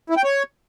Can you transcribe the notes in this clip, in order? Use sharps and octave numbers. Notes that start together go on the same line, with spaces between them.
E4
G5
C#5